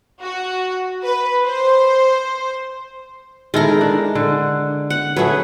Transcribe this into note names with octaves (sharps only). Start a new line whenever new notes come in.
F#4
B4
C5
D#3 G#3 E4 A4 A#4
D4
D3
F#5
F#3 A3 F#4 G#4 B4